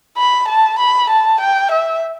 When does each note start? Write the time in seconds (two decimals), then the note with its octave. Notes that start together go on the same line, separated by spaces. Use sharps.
0.18 B5
0.48 A5
0.79 B5
1.10 A5
1.41 G5
1.71 E5